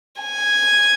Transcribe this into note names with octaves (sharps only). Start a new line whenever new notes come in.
G#5